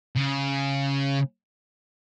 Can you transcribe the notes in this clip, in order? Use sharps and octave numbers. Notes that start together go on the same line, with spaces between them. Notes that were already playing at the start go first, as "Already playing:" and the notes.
C#3